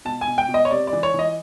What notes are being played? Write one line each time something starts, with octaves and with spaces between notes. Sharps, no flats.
B2 A5
G#5
B2
G5
B2
D#5
C#5
C3 D5
D5
E3
C#5
E3 D#5